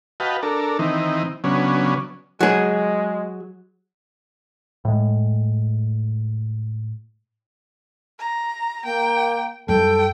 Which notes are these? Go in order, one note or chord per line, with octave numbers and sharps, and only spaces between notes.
F#4 B4 D#5 F5 G5 A5
D4 A4 A#4
D#3 E3 C4 D#4
C#3 F#3 B3 C#4 D4
F#3 G#3 G#4
A2 G#3
A#5
A#3 G5
F#2 G3 A4 G5